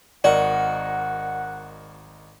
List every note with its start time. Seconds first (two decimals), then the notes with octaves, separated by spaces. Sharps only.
0.24 G#1 F#4 A#4 D5 D#5 F#5